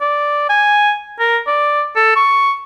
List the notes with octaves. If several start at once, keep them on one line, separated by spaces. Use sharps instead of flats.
D5
G#5
A#4
D5
A4
C#6